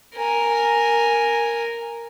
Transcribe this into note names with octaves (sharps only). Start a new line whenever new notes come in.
A#4 G#5